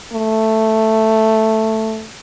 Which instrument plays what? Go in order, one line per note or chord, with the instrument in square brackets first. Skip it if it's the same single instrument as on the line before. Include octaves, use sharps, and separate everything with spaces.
[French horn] A3